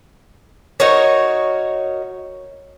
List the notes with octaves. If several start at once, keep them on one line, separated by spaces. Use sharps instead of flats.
D#4 F#4 A#4 C#5